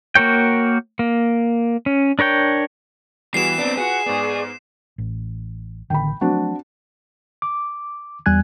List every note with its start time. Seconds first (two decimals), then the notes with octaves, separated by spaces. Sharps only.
0.15 A#3 F#4 A#4 C#5 G5
0.99 A#3
1.86 C#4
2.19 D4 A#4 C#5 G5
3.34 E3 G3 B3 F#4 G#4 C7 E7
3.58 B3 C4 D4 B4 D5
3.77 F4 F#4 G#4 B4 F#5
4.06 G#2 B3 D5 C#6 D6
4.98 A1
5.90 A1 D3 D#3 G5 B5
6.21 F3 F#3 A3 C4 D4 F#4
7.42 D6
8.26 E2 G3 G#5 F#6 G#6